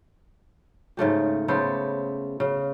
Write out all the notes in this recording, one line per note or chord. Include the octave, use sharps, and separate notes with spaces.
G#2 C#3 A3 G4
C#3 B3 A4 C5
C#3